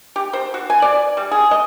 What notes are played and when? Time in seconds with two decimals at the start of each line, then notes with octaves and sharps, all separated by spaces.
0.16 G4
0.33 C5
0.54 F#4
0.70 G#5
0.82 D5
1.17 G3
1.31 G#4
1.51 D#5